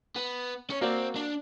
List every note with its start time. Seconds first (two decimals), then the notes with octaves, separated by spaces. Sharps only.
0.16 B3
0.70 C#4 C#5
0.81 A#3 C4 F#4 D5
1.16 D4